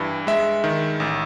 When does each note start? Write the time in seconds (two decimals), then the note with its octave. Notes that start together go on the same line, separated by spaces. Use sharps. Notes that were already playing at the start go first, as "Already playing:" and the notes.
Already playing: G2 E3
0.27 G#3 E5
0.64 D#3
1.00 A1